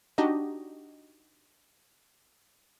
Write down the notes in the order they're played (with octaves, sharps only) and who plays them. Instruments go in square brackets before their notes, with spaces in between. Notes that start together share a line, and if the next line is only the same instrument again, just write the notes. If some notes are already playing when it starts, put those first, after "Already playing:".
[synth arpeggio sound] D4 D#4 F#4 G4 D#5